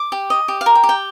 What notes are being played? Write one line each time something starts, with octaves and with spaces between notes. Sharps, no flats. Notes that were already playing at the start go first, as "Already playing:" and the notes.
Already playing: D6
G4
D#5
G4
F5
A#4
G5
G4
G5